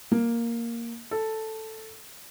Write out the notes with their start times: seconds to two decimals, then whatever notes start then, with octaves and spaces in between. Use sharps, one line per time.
0.11 A#3
1.11 A4